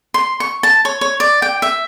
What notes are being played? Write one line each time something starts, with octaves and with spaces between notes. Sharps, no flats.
C6
C#6
A5
C#5
C#5
D5
G5
E5